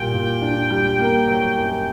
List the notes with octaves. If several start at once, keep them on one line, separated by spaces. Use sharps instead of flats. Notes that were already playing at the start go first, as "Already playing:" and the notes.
Already playing: A#2 G3 G5
A#2
D4
G3
A#3
F#3
F#2